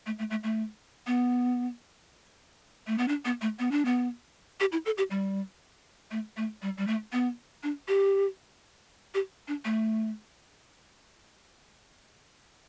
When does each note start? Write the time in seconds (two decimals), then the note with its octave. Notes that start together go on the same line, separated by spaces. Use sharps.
0.06 A3
0.19 A3
0.31 A3
0.43 A3
1.07 B3
2.87 A3
2.98 B3
3.08 D4
3.25 B3
3.42 A3
3.59 B3
3.71 D4
3.85 B3
4.60 G4
4.72 E4
4.86 A4
4.98 G4
5.11 G3
6.11 A3
6.37 A3
6.62 G3
6.78 G3
6.87 A3
7.12 B3
7.63 D4
7.88 G4
9.14 G4
9.48 D4
9.65 A3